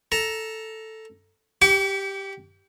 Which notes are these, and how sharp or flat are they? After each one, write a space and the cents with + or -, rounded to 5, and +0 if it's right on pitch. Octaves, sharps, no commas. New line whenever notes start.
A4 +0 A#5 +10
G4 +0 F#5 +45 D6 -45